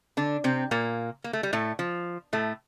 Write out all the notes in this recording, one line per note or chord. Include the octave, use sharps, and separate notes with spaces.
D3 D4
C3 C4
A#2 A#3
A#3
A3
G3
A2 A3
F3
A2 A3